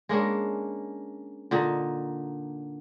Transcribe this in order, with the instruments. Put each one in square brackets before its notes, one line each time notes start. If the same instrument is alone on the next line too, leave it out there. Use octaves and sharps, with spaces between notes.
[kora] G#3 A#3 C#4 D4
A#2 D3 D#4